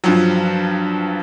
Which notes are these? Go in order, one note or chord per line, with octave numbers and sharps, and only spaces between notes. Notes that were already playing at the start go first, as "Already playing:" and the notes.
G2 F3 F#3